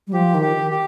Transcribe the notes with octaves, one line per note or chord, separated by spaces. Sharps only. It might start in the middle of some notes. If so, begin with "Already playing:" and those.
G3
F3 G4
D#3
G4
D#3
G4